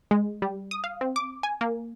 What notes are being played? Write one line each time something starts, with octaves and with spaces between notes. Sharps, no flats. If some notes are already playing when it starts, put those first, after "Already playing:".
G#3
G3
D#6
F5
C4
D6
G#5
A#3